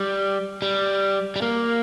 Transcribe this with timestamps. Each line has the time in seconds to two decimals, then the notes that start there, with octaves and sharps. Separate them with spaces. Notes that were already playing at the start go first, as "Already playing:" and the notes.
Already playing: G3
0.62 G3
1.36 G3
1.42 A#3